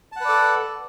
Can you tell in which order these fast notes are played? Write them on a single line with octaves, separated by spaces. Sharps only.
A5 F#5 B4 D5 A4